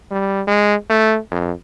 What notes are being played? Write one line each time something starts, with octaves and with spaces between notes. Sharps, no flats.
G3
G#3
A3
F2